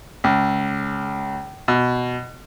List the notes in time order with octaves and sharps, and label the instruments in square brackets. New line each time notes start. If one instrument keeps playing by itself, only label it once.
[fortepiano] C#2
B2